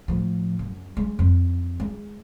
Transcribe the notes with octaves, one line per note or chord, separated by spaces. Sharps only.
A2 F3
F#2
G#3
F2
G#3